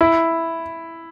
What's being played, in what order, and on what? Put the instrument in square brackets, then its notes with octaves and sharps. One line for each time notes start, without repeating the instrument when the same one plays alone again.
[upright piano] E4